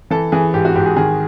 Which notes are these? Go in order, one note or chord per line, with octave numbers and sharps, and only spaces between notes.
E3 A4
E3 G#4
G#2 G4
F#4
G#2 G4
G#4
D#3 G#4